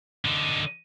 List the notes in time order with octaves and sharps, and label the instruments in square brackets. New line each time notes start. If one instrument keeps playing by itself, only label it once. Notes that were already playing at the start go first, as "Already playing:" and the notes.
[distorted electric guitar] D3 D#4